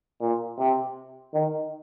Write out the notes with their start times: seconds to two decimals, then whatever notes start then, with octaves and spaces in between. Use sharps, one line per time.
0.21 A#2
0.58 C3
1.34 D#3